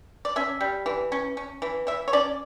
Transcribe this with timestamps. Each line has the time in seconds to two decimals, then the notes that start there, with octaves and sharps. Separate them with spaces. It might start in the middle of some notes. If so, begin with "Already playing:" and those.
0.25 D5
0.36 C#4 E5
0.61 G3
0.86 E3
1.12 C#4
1.37 C#4
1.62 E3
1.87 E3 E5
2.08 C#5
2.13 C#4 D5